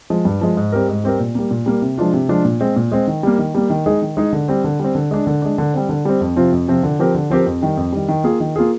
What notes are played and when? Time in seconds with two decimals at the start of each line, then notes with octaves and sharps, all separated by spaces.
0.10 F3 G#3
0.25 G2
0.41 F3 G#3
0.57 G#2
0.72 G3 C4 G4 A#4
0.88 G#2
1.04 G3 C4 G4 A#4
1.19 A#2
1.35 G3 A#3
1.51 A#2
1.66 G3 A#3
1.82 C3
1.98 F3 G#3 D4 F4
2.13 C3
2.29 F3 G#3 D4 F4
2.45 A#2
2.61 G#3 C4
2.76 A#2
2.92 G#3 C4
3.07 D#3
3.23 G3 A#3
3.39 D#3
3.55 G3 A#3
3.70 D#3
3.86 G#3 D#4 G#4
4.02 D#3
4.17 G#3 D#4 G#4
4.33 D3
4.48 G3 C4
4.64 D3
4.80 G3 C4
4.95 D3
5.11 G#3 D4
5.27 D3
5.42 G#3 D4
5.58 D3
5.74 G3 C4
5.89 D3
6.05 G3 C4
6.21 F2
6.36 C3 F3 C4 F4
6.52 F2
6.68 C3 F3 C4 F4
6.83 D3
6.99 F3 C4 G4 A#4
7.15 D3
7.30 F3 C4 G4 A#4
7.46 F2
7.62 D#3 G3
7.77 F2
7.92 D#3 G3
8.08 D#3
8.24 A#3 F4 G#4
8.40 D#3
8.56 A#3 F4 G#4